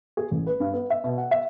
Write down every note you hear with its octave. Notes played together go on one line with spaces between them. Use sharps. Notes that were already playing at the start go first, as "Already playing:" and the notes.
G#4
A1
B4
G2
B3
E5
B2
F#5
E5